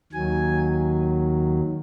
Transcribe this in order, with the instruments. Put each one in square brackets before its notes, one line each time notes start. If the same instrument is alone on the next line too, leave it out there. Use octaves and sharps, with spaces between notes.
[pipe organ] D#2 D#3 F#3 G#5